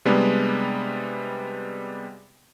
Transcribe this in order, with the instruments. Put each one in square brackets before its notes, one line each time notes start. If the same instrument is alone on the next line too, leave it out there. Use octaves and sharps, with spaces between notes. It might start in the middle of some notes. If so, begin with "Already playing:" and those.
[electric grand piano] C3 G3 G#3 B3 D4